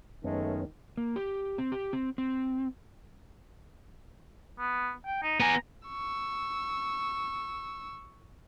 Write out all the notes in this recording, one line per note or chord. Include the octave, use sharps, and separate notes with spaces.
F#2 D#3 G#3 A3 B3 C#4
A#3
G4
C4
G4
C4
C4
B3
G5
D#4
B3 G#5 A#5
C#6 E6